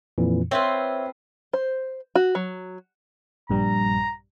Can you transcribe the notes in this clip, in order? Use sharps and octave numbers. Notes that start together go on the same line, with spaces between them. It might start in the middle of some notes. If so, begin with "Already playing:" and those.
F2 A#2 E3
C4 F4 B4 C#5 E5 G#6
C5
F#4
F#3
A#1 G2 G3 A#5